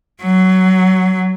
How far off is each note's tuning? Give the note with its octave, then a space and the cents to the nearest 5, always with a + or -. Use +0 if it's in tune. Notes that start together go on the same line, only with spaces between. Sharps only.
F#3 +15